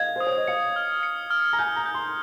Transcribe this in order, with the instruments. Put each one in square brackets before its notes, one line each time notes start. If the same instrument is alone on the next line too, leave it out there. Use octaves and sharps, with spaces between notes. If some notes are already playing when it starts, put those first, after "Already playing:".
Already playing: [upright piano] D#5 F5 [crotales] G#6
[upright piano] C5 [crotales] D#6
[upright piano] C#5
D#5
[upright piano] F5 [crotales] C#7
[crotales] F6
C#7
F6
[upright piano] A#5
[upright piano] G#5 [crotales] G6
[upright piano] A#5
[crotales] G6
[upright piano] C6